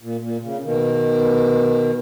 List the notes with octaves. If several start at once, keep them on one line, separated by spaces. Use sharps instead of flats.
A#2
A#2
C#3
B2 D#3